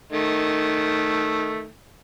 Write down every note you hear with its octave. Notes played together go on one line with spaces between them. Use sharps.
D#3 A3